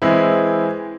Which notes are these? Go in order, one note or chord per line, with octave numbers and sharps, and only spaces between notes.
E3 G#3 C4 E4